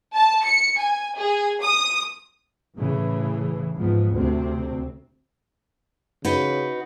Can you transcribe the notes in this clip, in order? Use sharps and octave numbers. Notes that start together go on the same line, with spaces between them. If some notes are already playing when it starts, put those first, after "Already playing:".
A5
C#7
G#5
G#4
D#6
A2 C#3 E3
G#2 F3 B3
D2 C3 C4
C#3 D#4 F#4 B4